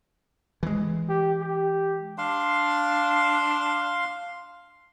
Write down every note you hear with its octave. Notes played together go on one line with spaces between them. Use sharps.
E3 G#3
G4
G4
D4 F5 C6